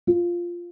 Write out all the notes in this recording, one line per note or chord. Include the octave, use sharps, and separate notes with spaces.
F4